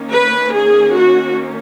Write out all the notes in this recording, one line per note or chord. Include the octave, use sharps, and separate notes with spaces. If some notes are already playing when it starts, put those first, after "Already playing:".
Already playing: D#3 A#3 C#4
B4
G#4
F#4